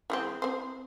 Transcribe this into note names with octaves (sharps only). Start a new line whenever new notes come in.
E3 G#3 C4
C4 C5